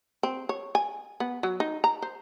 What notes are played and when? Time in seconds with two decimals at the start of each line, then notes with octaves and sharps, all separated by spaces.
0.23 C4
0.49 C#5
0.75 G#5
1.20 B3
1.43 F#3
1.60 D#4
1.84 A#5
2.02 C5